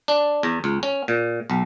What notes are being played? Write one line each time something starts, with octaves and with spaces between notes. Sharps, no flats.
D4
E2
C#2
C#4
A#2
B1